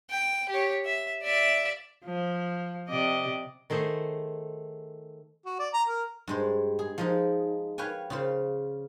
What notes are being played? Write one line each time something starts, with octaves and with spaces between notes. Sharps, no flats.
G5
G4 C#5
E5
D5 E5
F3
C3 D5 D#5
D#3 A3 G#4 C5
F#4
D5
A#5
A#4
G2 G#3 C5
G#4
F3 G#3 D#4
B4 C#5 F5 G5 G#5
C#3 F4 C5